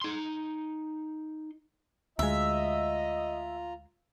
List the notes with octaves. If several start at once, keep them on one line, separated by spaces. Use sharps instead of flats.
D#4 C6
D2 G#3 F4 D#5 E5 A#5